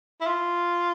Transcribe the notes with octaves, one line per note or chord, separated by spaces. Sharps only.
E4
F4